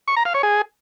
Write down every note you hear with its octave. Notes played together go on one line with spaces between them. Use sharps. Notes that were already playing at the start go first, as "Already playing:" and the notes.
C#6
A#5
F5
C#5
G#4